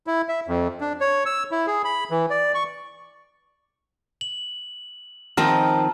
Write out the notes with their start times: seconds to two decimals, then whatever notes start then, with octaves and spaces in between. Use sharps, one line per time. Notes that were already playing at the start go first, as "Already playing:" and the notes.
0.07 E4
0.29 E5
0.48 F2
0.81 D4
1.01 C#5
1.26 E6
1.51 E4
1.67 G#4
1.84 B5
2.11 E3
2.30 D5
2.55 C#6
4.21 F#7
5.37 D#3 F3 C4 A5 A#5 F6